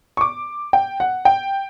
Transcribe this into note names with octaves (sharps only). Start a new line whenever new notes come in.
C#6
D6
G5
F#5
G5